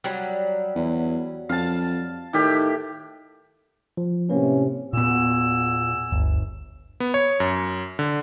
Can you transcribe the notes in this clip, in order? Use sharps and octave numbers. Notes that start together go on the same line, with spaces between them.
F#3 G3
E2
F2 F5 A5
A2 D#3 G4
F3
A2 C3 A#3 C#4 B4
E2 A#2 B3 G#5 E6
G1 D2
B3
C#5
F#2
D3